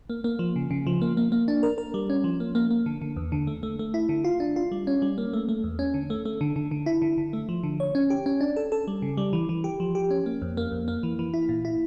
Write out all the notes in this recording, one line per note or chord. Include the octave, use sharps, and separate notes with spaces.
A#3
A#3
F3
C#3
C#3
F3
A#3
A#3
A#3
D4
A#4
A#4
G3
C#4
F3
A#3
A#3
A#3
D3
D3
E2
D3
A3
A3
A3
E4
D3
F4
D4
F4
G3
C#4
G3
A#3
A3
A3
E2
C#4
D3
A3
A3
D3
D3
D3
E4
D3
D3
A3
F3
D3
C#5
C#4
G4
C#4
D4
A4
A4
G3
C#3
G3
E3
E3
G4
F3
G4
C#4
A#3
F2
A#3
F2
A#3
E3
E3
E4
A#2
E4